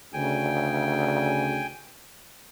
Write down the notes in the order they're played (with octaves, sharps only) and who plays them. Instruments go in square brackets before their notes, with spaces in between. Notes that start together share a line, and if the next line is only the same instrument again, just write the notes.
[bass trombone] D2 [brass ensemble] C#3 [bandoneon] G5 G#5